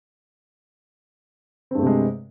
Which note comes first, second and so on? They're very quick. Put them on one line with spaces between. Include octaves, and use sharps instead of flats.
C4 G2 A3 C3 G#3